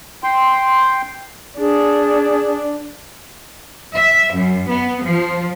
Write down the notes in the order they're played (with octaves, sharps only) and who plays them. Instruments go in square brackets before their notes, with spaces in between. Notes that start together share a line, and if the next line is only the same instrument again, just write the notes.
[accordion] G5 C6
[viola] D4 [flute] G#4
[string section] E5
F#2
B3
F3